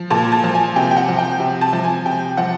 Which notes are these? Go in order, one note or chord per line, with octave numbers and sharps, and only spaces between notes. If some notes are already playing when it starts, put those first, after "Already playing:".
Already playing: F3
A#2 A5
A5
F3
G#5
C3 G5
G5
F#5
F3
G5
C3
A5
F3
G#5
C3 G5
F3 F#5